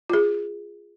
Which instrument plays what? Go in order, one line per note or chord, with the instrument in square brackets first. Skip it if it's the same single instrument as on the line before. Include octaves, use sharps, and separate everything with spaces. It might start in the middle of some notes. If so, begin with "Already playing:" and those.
[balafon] F4 G#4